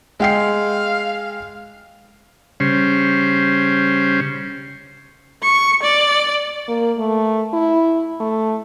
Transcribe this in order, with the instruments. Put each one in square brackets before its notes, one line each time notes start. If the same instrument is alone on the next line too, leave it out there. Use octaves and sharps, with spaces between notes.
[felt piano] G#3 G5 C7 [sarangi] F5
[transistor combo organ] C#3 G3 C#4 C5
[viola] C#6
D5
[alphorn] A#3
A3
E4
A3